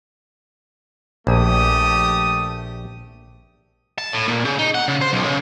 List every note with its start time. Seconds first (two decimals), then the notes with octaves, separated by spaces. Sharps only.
1.27 A#1 A3 G4 D#6
3.98 A5
4.13 A2
4.28 A#2
4.45 C#3
4.59 D#4
4.75 F#5
4.88 C#3
5.02 C5
5.13 B1
5.25 C#3